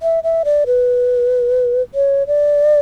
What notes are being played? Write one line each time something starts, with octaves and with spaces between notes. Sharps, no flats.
E5
E5
D5
B4
C#5
D5